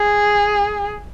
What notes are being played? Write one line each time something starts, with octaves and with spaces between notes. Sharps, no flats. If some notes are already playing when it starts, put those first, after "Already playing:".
Already playing: G#4